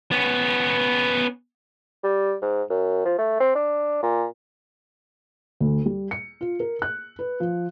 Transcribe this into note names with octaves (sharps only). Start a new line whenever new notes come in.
B3 C#4
G3
G#2
F#2
F3
A3
C4
D4
A#2
D2
G3
C#7
F4
A#4
F#6
B4
F3